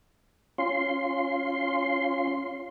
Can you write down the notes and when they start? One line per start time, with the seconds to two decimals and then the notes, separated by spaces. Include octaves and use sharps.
0.58 C#4 F4 C6